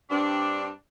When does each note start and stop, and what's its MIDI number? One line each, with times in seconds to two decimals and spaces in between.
0.10 0.70 43
0.10 0.70 60
0.10 0.70 62